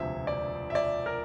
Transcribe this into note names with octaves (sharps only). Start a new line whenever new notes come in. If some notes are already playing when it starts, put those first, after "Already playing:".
Already playing: E1 D2 C3 F3 E5
D5
E5
D5
A#4